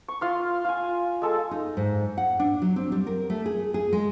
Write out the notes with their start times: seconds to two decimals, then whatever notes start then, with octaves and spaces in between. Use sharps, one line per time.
0.08 C#6
0.21 F4 F5 C6
0.65 F4 G#5
1.22 G#3 A4 A5
1.51 D#4
1.77 G#2
2.18 F#5
2.40 D4
2.62 F#3
2.76 C4
2.92 G3
3.07 A#4
3.30 A3
3.46 G#4
3.74 G#4
3.93 G#3